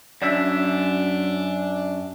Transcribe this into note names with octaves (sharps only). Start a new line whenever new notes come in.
F#2 D4 E5